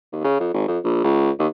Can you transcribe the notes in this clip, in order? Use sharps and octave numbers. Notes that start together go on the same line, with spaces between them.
D#2
C#3
F2
G#1
F2
A#1
C#2
D#2